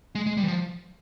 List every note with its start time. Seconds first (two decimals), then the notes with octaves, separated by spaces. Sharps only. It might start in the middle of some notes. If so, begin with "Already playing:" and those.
0.15 G#3
0.26 G#3
0.37 G3
0.43 E3
0.48 F3